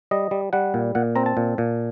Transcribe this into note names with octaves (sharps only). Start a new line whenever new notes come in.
G3 D#5
G3
G3 F#5
A#2
A#2 F#5
C4 A#5
A5
A#2
A#2